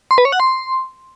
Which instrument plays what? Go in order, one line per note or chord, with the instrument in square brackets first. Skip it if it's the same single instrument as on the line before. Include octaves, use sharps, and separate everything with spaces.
[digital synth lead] C6
B4
C#5
F#5
C6